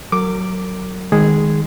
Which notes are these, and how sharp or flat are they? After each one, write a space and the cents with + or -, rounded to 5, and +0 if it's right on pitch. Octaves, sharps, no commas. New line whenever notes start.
F#3 +10 A#4 -40 D6 +0
D#3 +0 G#3 +0 G#4 +0